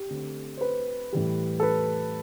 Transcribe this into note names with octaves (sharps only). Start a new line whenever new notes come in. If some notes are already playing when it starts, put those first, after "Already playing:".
Already playing: G4
D3 A3 C4
C5
B4
A2 E3 G3
A4
B4